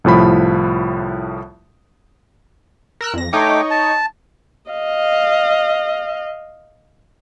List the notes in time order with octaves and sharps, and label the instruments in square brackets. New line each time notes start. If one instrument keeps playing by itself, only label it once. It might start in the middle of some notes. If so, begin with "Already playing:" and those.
[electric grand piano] C2 A2 F3 B5
[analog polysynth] A#4 E6 F#6
F2 A#6
[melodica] A3 G5 D6 [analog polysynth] D#4 C#5
[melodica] A5
[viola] D#5 F5